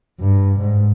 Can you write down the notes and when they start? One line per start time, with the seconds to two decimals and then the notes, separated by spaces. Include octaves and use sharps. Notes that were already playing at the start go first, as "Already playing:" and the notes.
0.20 G2
0.60 G#2